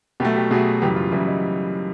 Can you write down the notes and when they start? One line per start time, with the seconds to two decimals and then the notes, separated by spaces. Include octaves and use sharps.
0.20 B2 F#3 A3 G4
0.36 G4
0.50 B2 F#3 A3 G#4
0.82 F#2 C#3 E3 G3 G4
0.96 F4
1.12 F#2 C#3 E3 G3 E4
1.28 D#4